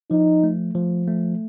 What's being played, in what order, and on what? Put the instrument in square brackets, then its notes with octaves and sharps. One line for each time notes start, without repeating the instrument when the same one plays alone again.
[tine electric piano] F3 [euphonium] D#4
[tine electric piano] A3
F3
A3